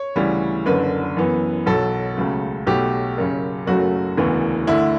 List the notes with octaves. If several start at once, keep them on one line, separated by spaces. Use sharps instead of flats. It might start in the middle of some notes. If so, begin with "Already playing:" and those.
Already playing: C#5
D2 C#3 E3 G3
F#1 F#2 D3 B4
F#2 E3 B3
B1 B2 F#3 A4
C#2 C#3 F#3 A3
B1 B2 F#3 A3 G4
F#1 F#2 C#3
F#1 F#2 C#3 F#3 A3 F#4
E1 D2 C#3 E3 B3
D2 D3 A3 E4